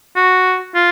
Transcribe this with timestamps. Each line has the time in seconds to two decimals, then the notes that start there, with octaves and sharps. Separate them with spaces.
0.16 F#4
0.75 F4